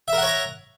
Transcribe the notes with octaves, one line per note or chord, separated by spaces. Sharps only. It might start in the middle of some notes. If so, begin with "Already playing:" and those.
A#4 C#5 E5 F#5 A#5